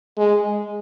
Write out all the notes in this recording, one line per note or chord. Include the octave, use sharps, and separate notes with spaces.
G#3